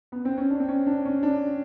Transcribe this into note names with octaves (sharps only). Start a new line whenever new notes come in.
B3
C4
C#4
D4
C4
C#4
D4
C#4
D4